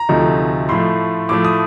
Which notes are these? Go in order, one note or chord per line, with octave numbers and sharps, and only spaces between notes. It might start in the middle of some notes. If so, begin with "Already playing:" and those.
Already playing: A#5
D2 C3 F3 A3 D#4
A2 F3 A3 C6
A2 F3 A3 D6
D#6